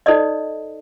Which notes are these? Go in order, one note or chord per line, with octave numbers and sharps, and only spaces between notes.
D#4 A4 C5 D5 D#5